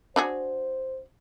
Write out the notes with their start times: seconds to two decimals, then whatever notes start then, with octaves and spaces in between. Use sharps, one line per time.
0.16 D4 F#4 G#4 C5